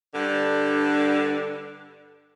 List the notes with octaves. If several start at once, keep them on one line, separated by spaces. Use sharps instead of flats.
G2 D3 D4